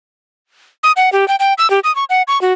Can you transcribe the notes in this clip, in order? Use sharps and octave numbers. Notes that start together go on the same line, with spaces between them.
D#6
F#5
G4
G5
G5
E6
G4
D#6
C#6
F#5
C#6
F#4